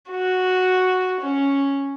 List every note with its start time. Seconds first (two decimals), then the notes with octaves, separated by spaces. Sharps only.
0.11 F#4
1.21 C#4